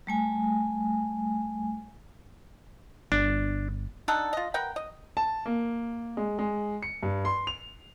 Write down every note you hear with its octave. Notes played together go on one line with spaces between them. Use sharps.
G3 A3 G#5
G1 D4
D4 D#4 A4 F#5
F4 D#5
A#4 B4 F#5 G5
D#5
A5
A#3
G#3
G#3
C#7
G2
C6
F7